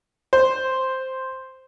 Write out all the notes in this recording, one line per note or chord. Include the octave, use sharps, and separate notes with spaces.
C5